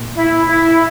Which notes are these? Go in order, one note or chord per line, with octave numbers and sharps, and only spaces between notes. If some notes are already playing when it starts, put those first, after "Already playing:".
Already playing: A#2
E4
E4